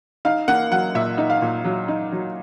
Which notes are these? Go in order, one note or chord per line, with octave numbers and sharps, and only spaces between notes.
D#4 F5
A#3 F#5
F#3 F#5
A#2 E5
D#4
F5
A#2
F#3
D#4
F#3